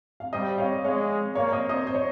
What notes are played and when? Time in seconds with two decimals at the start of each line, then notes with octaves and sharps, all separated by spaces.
0.20 F5
0.33 G3 C5 D#5
0.58 C#5 F5
0.84 G#3 C#5 F5
1.35 A#3 C#5 F5
1.52 C5 D#5
1.69 C5 D#5
1.87 C5
1.95 C#5